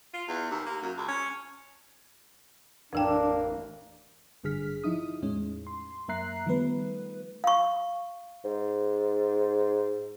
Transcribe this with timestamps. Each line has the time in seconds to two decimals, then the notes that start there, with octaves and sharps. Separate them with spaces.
0.14 F4
0.28 E2
0.51 D#2
0.66 A#3
0.83 F#2
0.97 C#2
1.09 C#4
2.93 A1 F2 E3 A#3 D4 G5
4.44 A1 G2 D3 G#4 F6 B6
4.84 F3 D#4 E4 D#6
5.22 E2 A2 G#3 C#4
5.67 C6
6.08 F#2 A#3 E5 A#5 F#6 C7
6.46 D#3 F3 G3 A3 B3 B4
7.44 F5 C#6
8.44 G#2